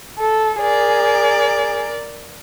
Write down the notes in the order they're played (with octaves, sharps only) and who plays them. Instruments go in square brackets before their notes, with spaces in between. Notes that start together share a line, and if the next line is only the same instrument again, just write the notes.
[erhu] A4
[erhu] G#4 [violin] A#4 D5